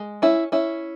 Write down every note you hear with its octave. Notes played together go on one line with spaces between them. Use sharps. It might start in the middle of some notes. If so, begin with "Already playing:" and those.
Already playing: G#3
C#4 E4
C#4 E4